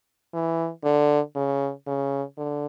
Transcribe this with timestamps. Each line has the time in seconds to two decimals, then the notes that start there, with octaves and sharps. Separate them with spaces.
0.34 E3
0.84 D3
1.35 C#3
1.87 C#3
2.38 D3